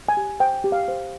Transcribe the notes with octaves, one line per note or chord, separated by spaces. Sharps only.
G#5
G4
C5 G5
G4
F5
C5